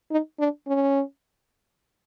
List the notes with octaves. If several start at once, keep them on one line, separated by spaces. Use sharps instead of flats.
D#4
D4
C#4